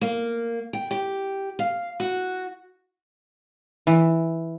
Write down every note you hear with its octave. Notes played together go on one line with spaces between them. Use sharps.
A#3
G5
G4
F5
F#4
E3